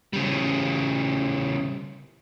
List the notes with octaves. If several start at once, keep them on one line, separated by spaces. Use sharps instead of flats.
C#3 G3